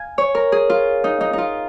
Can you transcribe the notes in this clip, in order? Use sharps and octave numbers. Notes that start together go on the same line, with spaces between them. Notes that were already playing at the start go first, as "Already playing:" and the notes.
Already playing: F5 G#5
C#5
A#4
G#4
F4
D#4
D#4
D#4 F4